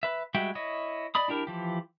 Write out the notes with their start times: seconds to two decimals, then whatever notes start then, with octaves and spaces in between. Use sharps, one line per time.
0.03 B4 E5
0.34 G3 G#3 F#4 E5 G5
0.55 E4 C#5 D#5
1.15 D5 D#5 B5 D#6
1.28 D4 E4 G4 A#4
1.47 E3 F3 G4